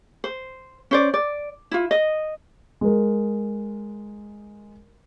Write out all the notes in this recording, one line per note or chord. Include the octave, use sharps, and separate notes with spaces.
C5
C#4 C5 D5
D5
E4 F4
D#5
G#3 A#4